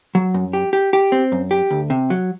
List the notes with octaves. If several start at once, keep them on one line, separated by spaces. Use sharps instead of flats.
F#3
F#2
G4
G4
G4
C4
F#2
G4
D2
C3
F#3